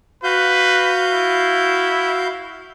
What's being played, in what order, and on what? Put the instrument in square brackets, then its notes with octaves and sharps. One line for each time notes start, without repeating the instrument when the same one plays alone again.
[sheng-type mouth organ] F#4 F5 G6 [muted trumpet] B4
[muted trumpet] E4